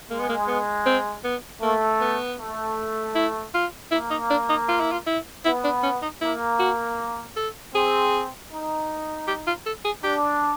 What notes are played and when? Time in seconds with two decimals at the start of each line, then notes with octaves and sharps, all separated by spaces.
0.10 G#3 A#3
0.19 B3
0.29 A#3
0.47 B3
0.86 C4
1.24 B3
1.62 A3 A#3
2.01 B3
2.40 A3
3.15 E4
3.54 F4
3.92 A#3 E4
4.11 D#4
4.30 D4
4.50 D#4
4.69 F4
4.80 E4
4.92 F4
5.06 E4
5.45 B3 E4
5.64 D4
5.83 C#4
6.02 D#4
6.21 A#3 E4
6.59 F#4
7.37 A4
7.75 C4 G#4
8.50 D#4
9.27 G4
9.47 F4
9.66 A4
9.85 G#4
10.04 D4 G4